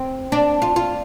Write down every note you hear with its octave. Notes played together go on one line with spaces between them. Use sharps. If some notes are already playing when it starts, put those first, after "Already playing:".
Already playing: C4
D4
F4
F4